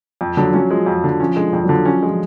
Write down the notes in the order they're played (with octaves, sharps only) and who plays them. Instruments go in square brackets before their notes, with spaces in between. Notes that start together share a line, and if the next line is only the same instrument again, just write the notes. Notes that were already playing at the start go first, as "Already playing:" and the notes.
[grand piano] F2 [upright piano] F3
[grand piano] D3 [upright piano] F#3
[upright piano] F#3 [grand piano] C#4
[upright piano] F3 [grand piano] G#3
[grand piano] F2
D3
[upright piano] F3 [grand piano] C#4
[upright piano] D3 [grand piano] G#3
[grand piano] F2 [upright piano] D3
[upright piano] F#3
[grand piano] D3 [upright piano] F3
[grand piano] C#4
[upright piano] F3 [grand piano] G#3